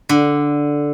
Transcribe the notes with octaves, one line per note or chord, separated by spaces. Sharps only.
D3